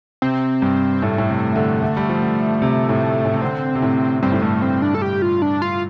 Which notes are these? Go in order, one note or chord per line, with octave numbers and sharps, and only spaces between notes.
C3 C4
G2
A2 A3
A2
C3
D3
D3
G3
F3
D3
C3
A2
A2
C3
D3 C4
C3
A2
G2 C4
A2
G2 A3
C4
D4
A4
G4
F4
D4
F4